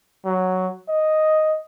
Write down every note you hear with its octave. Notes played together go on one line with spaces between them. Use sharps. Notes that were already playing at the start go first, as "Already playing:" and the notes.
F#3
D#5